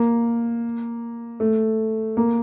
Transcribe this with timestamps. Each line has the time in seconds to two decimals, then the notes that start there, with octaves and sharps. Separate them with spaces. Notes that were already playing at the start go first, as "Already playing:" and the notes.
Already playing: A#3
1.40 A3
2.17 A#3